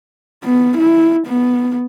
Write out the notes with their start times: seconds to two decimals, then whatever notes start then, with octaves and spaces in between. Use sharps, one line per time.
0.44 B3
0.78 E4
1.27 B3